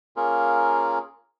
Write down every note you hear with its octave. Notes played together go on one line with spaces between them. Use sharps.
A#3 C#4 F4 G#4 A#4